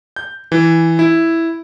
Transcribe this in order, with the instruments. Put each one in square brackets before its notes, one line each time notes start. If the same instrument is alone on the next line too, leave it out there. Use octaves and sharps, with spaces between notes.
[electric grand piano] G6
E3
E4